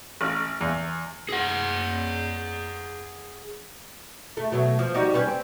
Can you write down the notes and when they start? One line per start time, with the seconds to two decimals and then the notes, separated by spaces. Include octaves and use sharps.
0.21 A1
0.61 E2
1.29 G#4 F#5
4.37 A3
4.52 B2 F#3 A3
4.79 F3
4.94 G3 D#4 F#4
5.14 G3 C#4 B4
5.28 C4